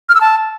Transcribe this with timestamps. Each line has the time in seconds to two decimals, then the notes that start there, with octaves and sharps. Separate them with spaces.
0.09 F6
0.15 E6
0.21 A5